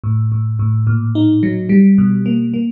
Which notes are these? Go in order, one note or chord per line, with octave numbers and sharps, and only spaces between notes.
A2
A2
A2
A#2
D#4
F#3
G3
B2
A#3
A#3